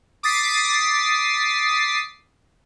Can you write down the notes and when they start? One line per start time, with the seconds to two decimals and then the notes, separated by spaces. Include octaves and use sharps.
0.23 D6 D#6 A6 B6 C7